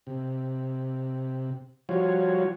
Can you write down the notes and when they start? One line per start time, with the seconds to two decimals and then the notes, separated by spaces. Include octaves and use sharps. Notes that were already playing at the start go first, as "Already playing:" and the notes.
0.07 C3
1.89 F3 G3 F4 F#4 C#5